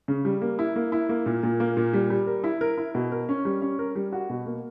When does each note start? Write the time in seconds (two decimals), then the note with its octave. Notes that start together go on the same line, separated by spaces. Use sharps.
0.08 C#3
0.25 G3
0.42 A#3
0.59 E4
0.76 A#3
0.92 E4
1.09 A#3
1.26 A#2
1.43 A#2
1.60 A#3
1.77 A#2
1.93 G3
2.10 G3
2.27 A#4
2.44 E4
2.61 A#4
2.78 E4
2.95 B2
3.12 A#4
3.29 C#4
3.45 G3
3.62 C#4
3.79 A#4
3.95 G3
4.12 F#4
4.30 B2
4.46 A#3